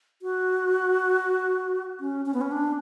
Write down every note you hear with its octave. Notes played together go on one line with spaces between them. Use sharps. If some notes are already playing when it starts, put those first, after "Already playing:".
F#4
C#4
C#4
B3
C#4
D4